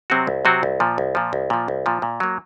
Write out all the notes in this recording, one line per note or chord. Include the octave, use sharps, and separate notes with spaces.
C3 F#3 C4 F#4
C2
C3 F#3 C4 F#4
C2
A#2 F3
C2
A#2 F3
C2
A#2 F3
C2
A#2 F3
A#2
F#3 A#3